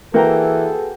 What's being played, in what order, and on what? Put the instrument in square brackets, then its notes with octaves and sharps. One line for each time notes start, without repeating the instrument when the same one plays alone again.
[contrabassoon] E3 [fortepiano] A#3 [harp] F#4 G5 A#5 [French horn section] G#4 A4 B4